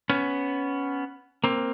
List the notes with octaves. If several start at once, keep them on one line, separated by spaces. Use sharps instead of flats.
B3 C#4
A#3 C4